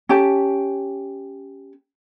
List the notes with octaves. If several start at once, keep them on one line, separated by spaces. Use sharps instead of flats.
C#4 G4 A5